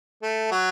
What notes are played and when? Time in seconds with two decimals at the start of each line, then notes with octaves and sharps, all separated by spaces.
0.22 A3
0.51 F#3